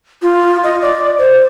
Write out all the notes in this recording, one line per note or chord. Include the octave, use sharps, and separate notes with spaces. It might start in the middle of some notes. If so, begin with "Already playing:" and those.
F4
D#5
D5
C5